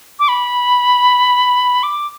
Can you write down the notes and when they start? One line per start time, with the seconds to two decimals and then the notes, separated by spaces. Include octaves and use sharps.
0.20 D6
0.28 B5
1.83 D6